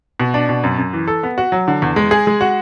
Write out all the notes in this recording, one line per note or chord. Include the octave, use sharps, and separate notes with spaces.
B2
D4
B2
F#2
F#2
E3
A4
B3
F#4
F#3
D3
E2
G#3
G#4
G#3
F#4